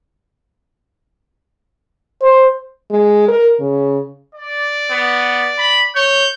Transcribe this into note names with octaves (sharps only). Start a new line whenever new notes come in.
C5
G#3
A#4
C#3
D5
B3
B5
C#5 G6